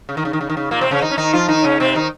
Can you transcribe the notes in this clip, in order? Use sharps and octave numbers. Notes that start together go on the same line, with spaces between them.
C#3
D#3
C#3
D#3
C#3
D#3
C#3
A#2 A#3
C3 C4
C#3 C#4
D#3 D#4
C#4
D#3 D#4
F3 F4
D#3 D#4
C#3 C#4
C3 C4
D#3 D#4